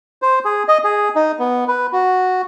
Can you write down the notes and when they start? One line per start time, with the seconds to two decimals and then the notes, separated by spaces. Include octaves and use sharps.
0.22 C5
0.45 G#4
0.68 D#5
0.84 G#4
1.15 D#4
1.39 B3
1.68 B4
1.93 F#4